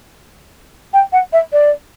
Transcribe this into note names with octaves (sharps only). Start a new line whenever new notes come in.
G5
F#5
E5
D5